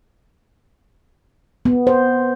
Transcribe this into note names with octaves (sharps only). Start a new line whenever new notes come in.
B3
C5